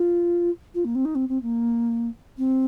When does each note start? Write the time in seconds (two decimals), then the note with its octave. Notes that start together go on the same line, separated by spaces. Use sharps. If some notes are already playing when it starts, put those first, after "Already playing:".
Already playing: F4
0.75 F4
0.85 A#3
0.95 C4
1.05 D#4
1.15 C4
1.29 C4
1.42 A#3
2.38 C4